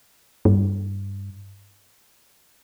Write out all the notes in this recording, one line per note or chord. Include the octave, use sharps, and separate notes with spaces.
G2